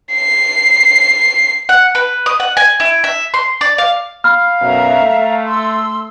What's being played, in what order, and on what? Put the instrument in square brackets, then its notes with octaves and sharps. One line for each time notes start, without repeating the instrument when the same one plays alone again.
[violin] C7
[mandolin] F#5
B4
D#6
F#5
G#5
E4
E5
C6
D5
F5
[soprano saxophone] F5 [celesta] B5 F6
[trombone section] B1 F#2 B2 [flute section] E5 A#5
[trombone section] A3
[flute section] C6 E6